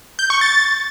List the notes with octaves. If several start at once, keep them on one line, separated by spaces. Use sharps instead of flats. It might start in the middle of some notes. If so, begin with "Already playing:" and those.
G6
C#6
A6